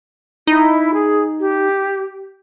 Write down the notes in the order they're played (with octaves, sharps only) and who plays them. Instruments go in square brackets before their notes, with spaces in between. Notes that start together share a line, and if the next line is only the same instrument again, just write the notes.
[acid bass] D#4 [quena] E4
[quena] G#4
G4